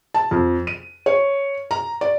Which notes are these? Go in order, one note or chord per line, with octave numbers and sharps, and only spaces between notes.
A5
F2
D#7
C#5
A#5
D5